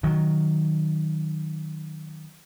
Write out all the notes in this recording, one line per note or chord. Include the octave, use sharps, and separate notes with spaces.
D#3 F#3